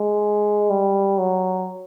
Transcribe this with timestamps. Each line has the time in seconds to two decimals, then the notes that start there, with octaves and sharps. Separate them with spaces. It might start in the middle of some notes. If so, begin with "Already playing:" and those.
Already playing: G#3
0.70 G3
1.18 F#3